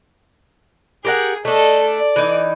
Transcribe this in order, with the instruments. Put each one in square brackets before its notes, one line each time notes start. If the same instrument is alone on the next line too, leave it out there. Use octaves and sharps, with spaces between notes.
[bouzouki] G4 A#4 F#5 [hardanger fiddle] G#4
[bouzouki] A3 D4 [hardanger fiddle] A4 D#5
[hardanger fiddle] D5
[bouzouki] E3 D#4